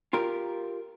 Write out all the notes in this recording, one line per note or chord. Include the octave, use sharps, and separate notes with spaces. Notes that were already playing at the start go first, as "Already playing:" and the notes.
F4 G4 A#4